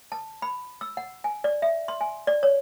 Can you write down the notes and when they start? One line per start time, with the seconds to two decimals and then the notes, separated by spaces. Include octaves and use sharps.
0.12 A5
0.42 B5
0.81 E6
0.97 F#5
1.24 G#5
1.44 D5
1.62 E5
1.88 C6
2.01 G#5
2.27 D5
2.43 C#5